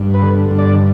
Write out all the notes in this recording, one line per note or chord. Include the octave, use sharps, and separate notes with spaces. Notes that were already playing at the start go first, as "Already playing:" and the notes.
Already playing: G2
B4
D3
G2
D5